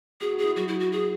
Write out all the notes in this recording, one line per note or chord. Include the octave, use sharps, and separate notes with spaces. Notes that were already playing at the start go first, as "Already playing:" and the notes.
F#4 G#4
F#4
G#4
E4
F#3 F#4
E4
F#4
G#4